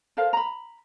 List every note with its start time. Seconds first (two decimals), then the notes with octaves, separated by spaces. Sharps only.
0.17 A4 A#4 C5 F5
0.33 A#5 B5